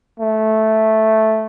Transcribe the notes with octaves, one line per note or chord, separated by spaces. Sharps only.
A3